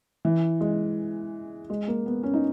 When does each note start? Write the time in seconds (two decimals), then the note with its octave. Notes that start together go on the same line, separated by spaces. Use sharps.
0.25 E3
0.61 G#3
1.70 G#3
1.88 A#3
2.06 B3
2.23 C#4
2.34 D#4